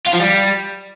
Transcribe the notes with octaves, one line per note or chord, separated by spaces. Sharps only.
F4
F3
G3